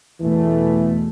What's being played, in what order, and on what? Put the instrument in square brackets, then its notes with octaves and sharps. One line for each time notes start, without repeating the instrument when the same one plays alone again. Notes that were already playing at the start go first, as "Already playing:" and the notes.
[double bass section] E2 B2 A3 [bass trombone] E3